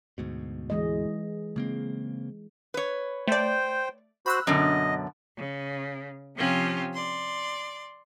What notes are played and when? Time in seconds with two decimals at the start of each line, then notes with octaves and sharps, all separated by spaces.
0.18 D2 G#2 B2
0.70 E3 G#3 D#5
1.56 C#3 G#3 A#3 C4
2.74 B4 C#5
3.28 A3 C5 D5 G5
4.26 F#4 C5 B5 E6 F#6
4.47 F#2 B2 D3 D#5
5.36 C#3
6.35 C3 F3 C4 C#4 F4 G4
6.92 D5 C6